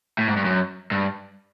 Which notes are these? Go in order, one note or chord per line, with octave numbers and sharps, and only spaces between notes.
A2
G#2
G2
F#2
G2